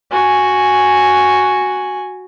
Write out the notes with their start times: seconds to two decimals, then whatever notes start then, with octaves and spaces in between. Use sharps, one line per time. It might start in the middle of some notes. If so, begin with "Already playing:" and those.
0.11 F#4 G#5